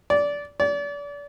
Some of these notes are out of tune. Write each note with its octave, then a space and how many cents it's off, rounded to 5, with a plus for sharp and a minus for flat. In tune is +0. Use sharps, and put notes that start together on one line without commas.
D5 -20
D5 -35